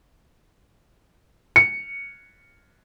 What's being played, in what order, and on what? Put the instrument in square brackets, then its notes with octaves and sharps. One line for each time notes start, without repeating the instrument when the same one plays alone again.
[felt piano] C#7